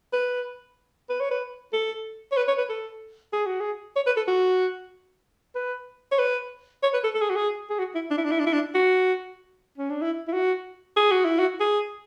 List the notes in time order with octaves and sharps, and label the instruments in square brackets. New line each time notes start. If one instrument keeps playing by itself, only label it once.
[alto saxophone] B4
B4
C#5
B4
A4
C#5
B4
C#5
B4
A4
G#4
F#4
G#4
C#5
B4
A4
F#4
B4
C#5
B4
C#5
B4
A4
A4
G#4
F#4
G#4
G#4
F#4
E4
D4
E4
D4
E4
D4
E4
D4
F#4
C#4
D4
E4
E4
F#4
G#4
F#4
E4
F#4
G#4